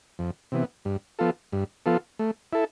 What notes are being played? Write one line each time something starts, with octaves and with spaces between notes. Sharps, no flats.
F2
C3 E3 B3
G2
F3 B3 F4 A4
G2
F3 B3 F4 A4
A3
E4 A4